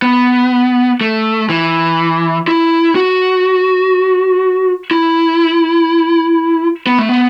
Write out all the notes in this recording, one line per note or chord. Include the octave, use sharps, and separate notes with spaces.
B3
A3
E3
E4
F#4
E4
B3
A3
B3